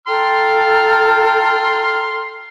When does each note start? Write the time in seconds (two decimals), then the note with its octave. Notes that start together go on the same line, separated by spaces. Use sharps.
0.08 A4 G5 A#5 C6 F6